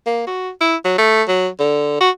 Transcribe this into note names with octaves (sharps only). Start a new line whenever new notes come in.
A#3
F#4
E4
F#3
A3
F#3
D3
F#4